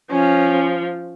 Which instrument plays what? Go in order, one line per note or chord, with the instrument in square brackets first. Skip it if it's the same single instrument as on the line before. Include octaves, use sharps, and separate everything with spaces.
[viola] F3 [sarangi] C#4